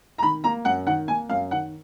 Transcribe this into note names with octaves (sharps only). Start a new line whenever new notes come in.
A#5
D#3 B5
A#3 A#5
F#2 F#5
D#3 F#5
A#3 G#5
F#2 F5
D#3 F#5